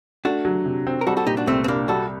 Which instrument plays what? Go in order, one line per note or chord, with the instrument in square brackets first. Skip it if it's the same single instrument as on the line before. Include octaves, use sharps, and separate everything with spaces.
[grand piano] A3 [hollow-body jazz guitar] D4 F#4
[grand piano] F#3
C3
C4
[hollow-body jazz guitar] A#4
[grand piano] G3 [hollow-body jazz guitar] F#4 A4
[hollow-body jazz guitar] F#4 A4
[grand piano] A#2 [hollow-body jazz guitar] D#4 G4
[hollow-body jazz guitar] D4 F#4
[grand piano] C2 [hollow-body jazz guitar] A3 C4
[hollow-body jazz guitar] C4
[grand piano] C2 [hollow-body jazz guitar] A#3 D4
[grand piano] G3 [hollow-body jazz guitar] F#4 A4